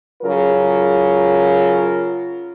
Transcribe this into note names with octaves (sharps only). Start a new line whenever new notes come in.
C#3 F#3 F4 A#4